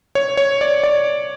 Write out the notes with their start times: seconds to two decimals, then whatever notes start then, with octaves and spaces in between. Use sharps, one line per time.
0.15 C#5
0.37 C#5
0.61 D5
0.84 D5